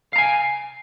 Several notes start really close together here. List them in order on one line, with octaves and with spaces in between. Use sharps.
F5 A#5 G#5